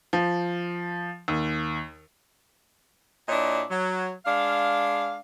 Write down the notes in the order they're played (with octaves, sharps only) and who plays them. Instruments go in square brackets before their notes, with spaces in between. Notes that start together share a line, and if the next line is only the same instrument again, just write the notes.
[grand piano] F3
D#2
[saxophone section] A#2 D4 E4 C#5 D#5
F#3
G#3 D4 F5